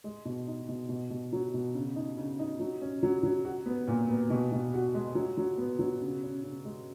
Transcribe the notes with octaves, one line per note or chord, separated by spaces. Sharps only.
G#3
B2
D#4
B2
B2
B2
F#3
B2
C#3
D#4
C#3
D#4
F#3
C#4
F#3
F#3
F#4
B3
A#2
B3
B2
B2
F#4
G#3
F#3
F#3
B3
F#3
C#3
C#4
C#3
G#3